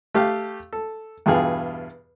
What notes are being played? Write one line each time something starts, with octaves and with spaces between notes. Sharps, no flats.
A3 G4 F5
A4
E2 G2 B2 F4 G#4 F6